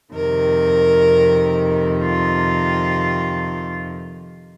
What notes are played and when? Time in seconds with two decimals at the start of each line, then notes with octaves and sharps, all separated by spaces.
0.14 F2 C3 D#3 A#4
2.01 F4